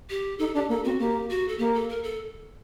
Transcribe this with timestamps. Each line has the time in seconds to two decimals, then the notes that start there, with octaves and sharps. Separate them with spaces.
0.10 G4
0.39 D#4 A4
0.54 D4 G4
0.69 A#3 A4
0.84 C4 F#4
0.99 A#3 G4
1.29 F#4
1.48 A4
1.59 A#3 G4
1.74 A4
1.89 A#4
2.03 A4